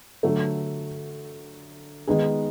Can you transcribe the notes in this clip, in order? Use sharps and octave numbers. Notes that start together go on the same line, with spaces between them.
D3 F#3 A3
D#3 G#3 B3 D#4 G#4